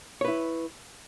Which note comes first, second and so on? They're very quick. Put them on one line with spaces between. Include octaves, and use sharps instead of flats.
C#5 B4 E4